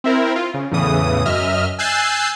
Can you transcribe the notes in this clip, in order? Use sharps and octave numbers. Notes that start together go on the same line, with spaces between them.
C4 E4 A#4
F4
C#3
E2 A2 C#3 E3 D#6
F#2 D#5 E5 F6
G#5 E6 F#6 G6 A6 C7